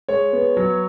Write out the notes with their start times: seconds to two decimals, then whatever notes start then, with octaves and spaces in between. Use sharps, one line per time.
0.09 G#3 C#5
0.33 B3
0.57 F#3